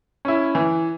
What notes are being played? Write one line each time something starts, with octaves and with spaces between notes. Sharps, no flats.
C#4 E4
E3